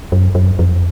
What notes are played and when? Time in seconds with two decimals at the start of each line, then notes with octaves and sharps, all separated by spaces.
0.12 F#2
0.35 F#2
0.59 F2